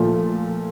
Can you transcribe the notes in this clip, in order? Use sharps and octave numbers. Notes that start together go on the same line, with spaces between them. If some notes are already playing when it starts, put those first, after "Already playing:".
Already playing: A#2 F3 A3